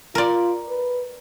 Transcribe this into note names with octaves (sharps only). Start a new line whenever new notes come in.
F4 A#4 D5
B4